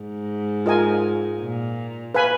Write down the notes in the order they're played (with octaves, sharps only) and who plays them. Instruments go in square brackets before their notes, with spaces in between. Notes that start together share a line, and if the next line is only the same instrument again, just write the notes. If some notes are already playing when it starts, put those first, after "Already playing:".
Already playing: [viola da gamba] G#2
[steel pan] F4 A#4 D#5 G#5
[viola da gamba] A#2
[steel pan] B4 F5 G#5 B5